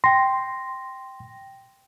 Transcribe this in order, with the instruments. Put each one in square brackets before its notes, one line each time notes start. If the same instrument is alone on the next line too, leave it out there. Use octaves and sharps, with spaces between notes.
[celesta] G5 A#6 [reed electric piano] C6